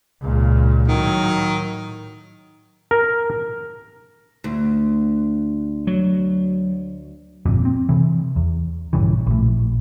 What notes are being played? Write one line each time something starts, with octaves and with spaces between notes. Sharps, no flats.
C#2 A#2
A2 D#3 F#3
A#4
D2
F#3
G1 F2 A#2
C4
C3 E3
E2
A#1 G2 C#3 E3
A#1 A2